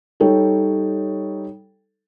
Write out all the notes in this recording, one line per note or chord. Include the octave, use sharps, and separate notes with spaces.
G3 D#4 A4 C#5 G5